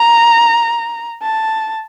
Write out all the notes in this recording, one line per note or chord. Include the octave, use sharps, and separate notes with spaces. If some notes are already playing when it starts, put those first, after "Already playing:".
Already playing: A#5
A5